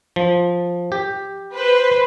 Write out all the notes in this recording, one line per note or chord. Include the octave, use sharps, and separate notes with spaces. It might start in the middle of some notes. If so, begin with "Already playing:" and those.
F3
G4
B4 C5